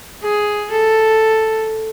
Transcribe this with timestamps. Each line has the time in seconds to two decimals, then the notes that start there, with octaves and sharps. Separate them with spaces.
0.23 G#4
0.71 A4